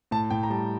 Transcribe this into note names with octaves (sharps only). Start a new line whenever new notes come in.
A2 A5
A2 G5
A#5
G3 A5